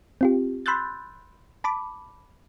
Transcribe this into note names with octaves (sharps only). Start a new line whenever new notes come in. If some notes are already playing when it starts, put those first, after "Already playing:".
C4 F4 G4
B5 C6 E6 F#6 G6 A6
A5 B5 D6